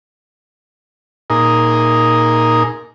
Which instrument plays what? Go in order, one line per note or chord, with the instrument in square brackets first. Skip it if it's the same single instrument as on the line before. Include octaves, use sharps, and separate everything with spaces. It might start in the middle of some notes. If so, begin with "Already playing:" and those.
[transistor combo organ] A#2 D#4 G#4 A#4